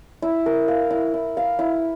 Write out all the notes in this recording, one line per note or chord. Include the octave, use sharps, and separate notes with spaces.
E4
A#4
F5
E4
E4
F5
E4